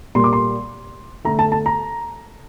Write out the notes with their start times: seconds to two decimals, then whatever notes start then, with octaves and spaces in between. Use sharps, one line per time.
0.15 A#2 G3 A#3 C6
0.24 D6
0.33 C6
1.25 D3 A3 A#5
1.39 A5
1.52 A5
1.66 A#5